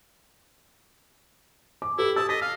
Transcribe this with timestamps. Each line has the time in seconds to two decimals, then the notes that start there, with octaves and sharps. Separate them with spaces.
1.82 D6
1.98 E4 G4 A4
2.16 A5 D#6 E6
2.29 D#5 B6
2.42 F5